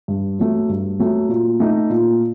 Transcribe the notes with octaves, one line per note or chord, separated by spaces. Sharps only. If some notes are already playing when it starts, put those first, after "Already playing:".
G2
F#3 A3
G2
F#3 A3
A#2
A3 D#4
A#2